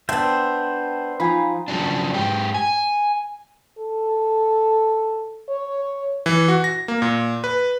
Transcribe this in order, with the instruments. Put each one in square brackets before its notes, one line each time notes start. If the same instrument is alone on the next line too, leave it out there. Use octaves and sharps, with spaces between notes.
[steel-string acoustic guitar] B3 D4 [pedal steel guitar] C5 E5 G5
[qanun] F3 D#4 [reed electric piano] G#5 B5
[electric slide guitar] C#3 F3 F#3 D4
G#2 G4
G#5
[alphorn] A4
C#5
[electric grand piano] E3
F#4
A#6
A#3
A#2
B4